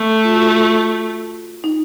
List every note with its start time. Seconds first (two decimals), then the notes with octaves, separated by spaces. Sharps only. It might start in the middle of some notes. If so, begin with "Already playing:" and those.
Already playing: A3
0.24 F4
0.34 F#4
0.44 F4
1.64 D#4